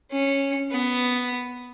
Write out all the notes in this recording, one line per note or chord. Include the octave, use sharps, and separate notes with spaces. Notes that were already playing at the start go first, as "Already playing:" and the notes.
C#4
B3